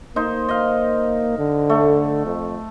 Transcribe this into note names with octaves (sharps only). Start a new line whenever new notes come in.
A#3 D#4 C5
D#5 F5
D3
A3
F2